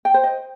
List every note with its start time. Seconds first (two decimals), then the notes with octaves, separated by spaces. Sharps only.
0.05 G5
0.14 C5
0.23 D#5